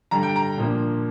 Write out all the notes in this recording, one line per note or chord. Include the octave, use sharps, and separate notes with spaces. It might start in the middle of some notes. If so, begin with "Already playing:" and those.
G2 D3 G3 A#5
G5
A#5
A#2 F3 A#3 D4